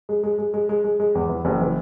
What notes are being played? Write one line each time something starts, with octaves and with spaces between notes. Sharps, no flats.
G#3
G#3
G#3
G#3
G#3
G#3
G#3
E2
E3
F#1
E3